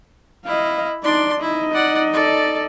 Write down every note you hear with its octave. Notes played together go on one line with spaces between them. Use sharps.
E4 D#5 F5
D4 D#4 D5 C6
D#4 E4 D#5
D5 F#5
A4 D5